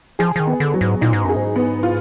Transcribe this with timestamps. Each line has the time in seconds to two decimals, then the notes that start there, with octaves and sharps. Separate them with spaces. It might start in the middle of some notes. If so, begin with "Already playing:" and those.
0.19 F3 G#4
0.36 F3
0.40 D#3
0.47 B3
0.60 D3
0.74 F#3
0.81 G#2
1.01 A#2 D#4
1.13 G#2
1.25 F#2 G#4
1.36 G#2
1.56 B3
1.83 F4